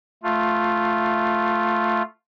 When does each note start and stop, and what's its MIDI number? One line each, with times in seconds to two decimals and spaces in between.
0.23 2.02 57
0.23 2.02 65